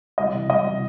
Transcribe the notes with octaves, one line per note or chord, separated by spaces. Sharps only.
C2 D#5
C3 E3
C2 D#5
C3 E3